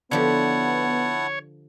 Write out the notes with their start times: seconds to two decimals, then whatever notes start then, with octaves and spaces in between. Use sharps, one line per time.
0.11 D3 F3 B3 E4 G4 C#5 F#5 A5